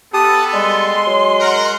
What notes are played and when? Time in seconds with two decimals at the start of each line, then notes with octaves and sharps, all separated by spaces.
0.14 B3 G4 A4 A5 D#6
0.53 G3 G#3 C6
1.07 F#3
1.40 A#4 F#5